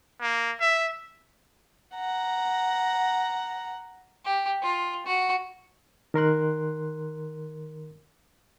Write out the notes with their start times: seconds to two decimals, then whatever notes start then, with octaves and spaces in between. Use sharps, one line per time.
0.21 A#3
0.60 E5
1.95 F#5 A#5
4.25 G4
4.62 F4
5.06 F#4
6.14 D#3 A#4 C6 F#6